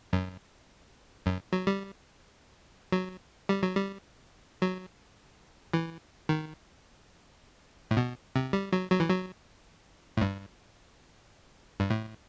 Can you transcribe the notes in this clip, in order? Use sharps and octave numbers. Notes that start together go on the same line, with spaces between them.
F#2
F#2
F#3
G3
F#3
G3
F#3
G3
F#3
E3
D#3
A2
B2
C3
G3
F#3
F#3
E3
F#3
A2
G2
G2
A2